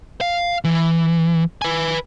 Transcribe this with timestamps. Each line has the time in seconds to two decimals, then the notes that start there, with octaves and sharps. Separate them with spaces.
0.21 F5
0.64 E3
1.62 B4 G#5